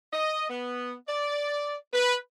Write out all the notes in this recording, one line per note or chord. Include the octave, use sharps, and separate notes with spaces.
D#5
B3
D5
B4